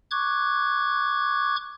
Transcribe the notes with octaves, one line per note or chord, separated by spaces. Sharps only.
C#6 D6 F#6 G#6